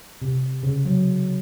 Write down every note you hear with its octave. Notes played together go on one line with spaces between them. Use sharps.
C3
C#3
F#3